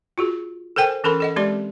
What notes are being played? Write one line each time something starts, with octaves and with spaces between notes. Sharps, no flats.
F4 F#4 G#4
A4 A#4 C5 G5 G#5
E3 C#4 A4 A#4 B5 C6
A4 D#5 F#5
G#3 C4 G4 D5 C6